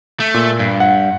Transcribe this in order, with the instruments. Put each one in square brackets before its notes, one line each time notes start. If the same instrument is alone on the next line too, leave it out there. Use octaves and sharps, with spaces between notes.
[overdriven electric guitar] A3
[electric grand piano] A#2
[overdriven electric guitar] G2
[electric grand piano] F#5